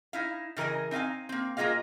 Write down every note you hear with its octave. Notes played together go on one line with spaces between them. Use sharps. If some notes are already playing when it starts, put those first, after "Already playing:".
D#4 E4 F5
C#3 E3 A#4 D#5 G#5
C4 D#4 E5 F5 G#5
A#3 C4
G#3 A#3 F4 G#4 D#5 F5